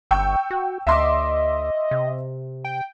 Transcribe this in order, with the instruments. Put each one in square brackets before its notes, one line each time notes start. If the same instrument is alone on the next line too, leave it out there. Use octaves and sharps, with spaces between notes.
[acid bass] G1 [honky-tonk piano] G5 C#6 E6
[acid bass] F#4
[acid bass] D2 [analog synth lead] D#5 [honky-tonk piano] E5 C6 D6
[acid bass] C3
[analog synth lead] G5